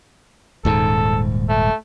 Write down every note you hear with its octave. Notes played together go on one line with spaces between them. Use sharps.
D#1 G#2 A4
A3